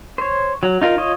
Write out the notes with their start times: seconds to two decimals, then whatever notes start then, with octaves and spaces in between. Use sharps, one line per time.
0.18 C5 C#5
0.63 F#3
0.82 D#4 F4 A#4
0.98 F4 C#5 D#5